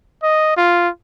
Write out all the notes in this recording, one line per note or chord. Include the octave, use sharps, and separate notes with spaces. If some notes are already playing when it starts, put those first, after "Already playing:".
D#5
F4